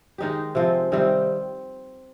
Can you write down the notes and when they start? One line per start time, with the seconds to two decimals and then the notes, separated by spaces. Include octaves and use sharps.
0.18 D#3 G#3 D#4 G4
0.55 C3 F3 C4
0.92 C3 D#3 G3 C4